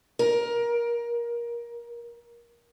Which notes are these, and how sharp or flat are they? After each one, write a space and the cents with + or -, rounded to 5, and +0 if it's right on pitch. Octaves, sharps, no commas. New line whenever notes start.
A#4 +20